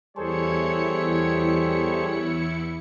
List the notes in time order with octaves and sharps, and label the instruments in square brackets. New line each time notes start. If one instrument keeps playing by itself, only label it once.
[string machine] E2 E4 C#7 [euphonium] G3 [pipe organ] G#4 A4 C5 [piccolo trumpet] C#5